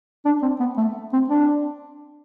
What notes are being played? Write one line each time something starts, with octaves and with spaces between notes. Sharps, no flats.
D4
C4
B3
A3
C4
D4